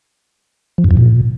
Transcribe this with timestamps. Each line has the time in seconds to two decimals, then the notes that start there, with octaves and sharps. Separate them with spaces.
0.78 F3
0.84 F#2
0.91 F2
0.97 A#2